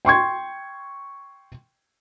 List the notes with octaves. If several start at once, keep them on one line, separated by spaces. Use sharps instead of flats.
G5 C6 C#6 G#6